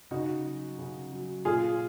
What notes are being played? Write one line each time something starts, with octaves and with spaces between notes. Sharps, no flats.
C#3 D#4 F#4
F#3
C#3
F#3
A#2 F4 G#4